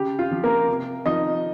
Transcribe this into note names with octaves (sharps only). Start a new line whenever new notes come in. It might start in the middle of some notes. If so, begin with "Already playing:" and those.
Already playing: C#3 G4
F4
F3
A#3 A#4
C3
F3 D#4 D#5